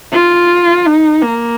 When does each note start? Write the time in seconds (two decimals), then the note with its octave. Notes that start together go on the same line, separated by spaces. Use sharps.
0.12 F4
0.86 D#4
1.22 A#3